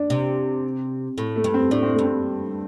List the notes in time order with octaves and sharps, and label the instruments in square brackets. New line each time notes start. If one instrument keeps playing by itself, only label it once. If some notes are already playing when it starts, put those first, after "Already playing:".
Already playing: [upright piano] D4
[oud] C3
A2
[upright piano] A3
[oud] G2
[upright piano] C4
[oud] A2 [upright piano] D4
[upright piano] C4
[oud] G2 [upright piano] A3
[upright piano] C4